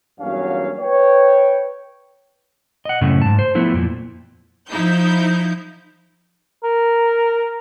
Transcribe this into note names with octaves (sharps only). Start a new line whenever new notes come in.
E2 G2 F#3 A#3 C#4 F5
B4 C#5 G5
D#5 F#5
F#2 A2 C#3 A3
G#2 A5
C5
F3 A3 B3 E4
F2 A#2 F3
F3 D#4 E4 G6
A#4